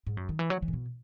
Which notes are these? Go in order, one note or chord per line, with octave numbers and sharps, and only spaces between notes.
G#2
F#2
D#3
E3
F#3
E3
A2
B2